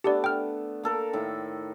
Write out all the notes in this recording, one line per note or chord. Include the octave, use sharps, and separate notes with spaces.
A3 B3 D4 G4 D5
G5 F6
A#3 A4 A#4
A2 D#3 E5